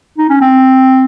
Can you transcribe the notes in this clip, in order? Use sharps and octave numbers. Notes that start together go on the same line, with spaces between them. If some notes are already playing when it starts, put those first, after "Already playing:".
D#4
C#4
C4